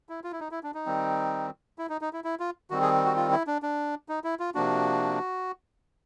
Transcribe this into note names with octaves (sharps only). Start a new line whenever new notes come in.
E4
F4
E4
D#4
E4
D4
D#4
D#3 G3 C4
E4
D#4
D#4
E4
E4
F4
D#3 G3 C4 F#4
G#4
F#4
F4
E4
D4
D4
D#4
E4
F4
C3 F3 A#3 D4 F#4